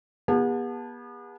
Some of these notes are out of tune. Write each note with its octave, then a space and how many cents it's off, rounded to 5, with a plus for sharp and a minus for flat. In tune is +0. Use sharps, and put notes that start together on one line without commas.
B3 -35 G#4 -45 A5 +0